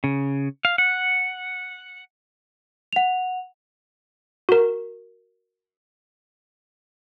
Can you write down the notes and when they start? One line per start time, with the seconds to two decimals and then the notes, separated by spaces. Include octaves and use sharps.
0.04 C#3
0.65 F5
0.78 F#5
2.93 F#5 F7
4.49 F#4 A#4